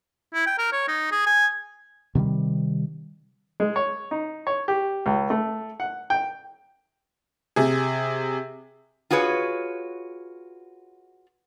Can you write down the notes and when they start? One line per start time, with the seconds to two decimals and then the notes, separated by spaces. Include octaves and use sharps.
0.34 E4
0.46 G5
0.58 A#4
0.72 C#5
0.88 D#4
1.12 G#4
1.26 G#5
2.15 C3 D#3 F#3 G3
3.60 G#3
3.76 C#5
4.11 D#4
4.47 C#5
4.68 G4
5.06 C#2
5.30 A3
5.80 F#5
6.10 G5
7.56 C3 G#4
9.11 F4 F#4 G#4 B4 C#5